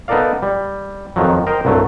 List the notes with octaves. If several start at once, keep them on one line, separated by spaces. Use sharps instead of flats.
B3 D#4 A4 A#4 D5 F5
G3
F2 D#3 F3 F#3
A#4 C5 D#5 G5
C2 G2 F#3 A3